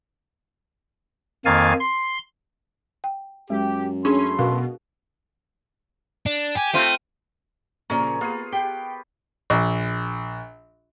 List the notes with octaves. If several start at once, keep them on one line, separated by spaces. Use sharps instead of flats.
F2 D#3 A#3 F5 G#5 A6
C6
G5
F#2 G#3 G4
A3 C#4 D4 G#4 B5 C6
B2 F#4 A#4 F5
D4
G4 G#5
A3 C4 F4 D#7
A#2 C#3 F3 A#4 C#5
A#3 B3 F4 G#4
G4 G5
A#1